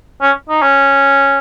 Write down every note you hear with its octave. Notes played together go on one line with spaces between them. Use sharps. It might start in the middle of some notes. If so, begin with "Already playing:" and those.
C#4
D#4
C#4